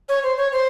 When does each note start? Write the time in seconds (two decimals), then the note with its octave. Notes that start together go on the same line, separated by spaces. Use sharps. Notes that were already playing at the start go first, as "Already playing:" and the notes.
0.09 C#5
0.23 C5
0.38 C#5
0.52 C5